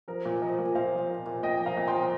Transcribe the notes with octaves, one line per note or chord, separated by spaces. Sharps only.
F3 A#4
A#2
F3 A#4 D#5
A#2
A#2 C5 F5
F3
A#2
A#2
A#2 D#5 G5
F3
F5 A#5
A#2
G5 C6
F3